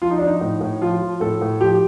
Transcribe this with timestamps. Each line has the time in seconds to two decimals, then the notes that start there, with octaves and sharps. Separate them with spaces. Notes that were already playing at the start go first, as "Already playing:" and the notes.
0.02 F3 F4
0.11 D#4
0.18 D4
0.22 F3 D#4
0.41 A2
0.61 A2
0.81 F3 F4
1.02 F3
1.20 A2 A4
1.41 A2
1.60 F3 G4